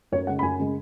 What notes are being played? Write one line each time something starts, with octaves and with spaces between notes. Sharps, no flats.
F#2 C#5
C#3 G#3 F#5
B5
F#2 G#5
C#3 G#3